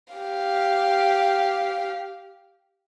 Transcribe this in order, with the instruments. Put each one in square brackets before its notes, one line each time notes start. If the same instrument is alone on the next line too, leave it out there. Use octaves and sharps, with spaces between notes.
[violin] G4 F5